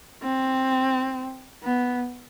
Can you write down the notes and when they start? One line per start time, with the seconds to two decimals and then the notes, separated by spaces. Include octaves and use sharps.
0.23 C4
1.64 B3